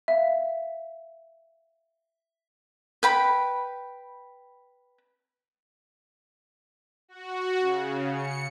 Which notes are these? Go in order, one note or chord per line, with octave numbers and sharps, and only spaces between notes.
E5 F5
B4 G5 B5
F#4
C#3
C#7